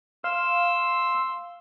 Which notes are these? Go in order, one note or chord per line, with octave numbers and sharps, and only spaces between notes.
F5 C6 E6